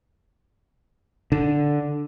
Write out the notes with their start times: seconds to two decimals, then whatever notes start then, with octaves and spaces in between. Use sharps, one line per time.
1.32 D3